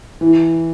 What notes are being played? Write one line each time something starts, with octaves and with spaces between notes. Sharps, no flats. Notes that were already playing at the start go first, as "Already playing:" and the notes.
E3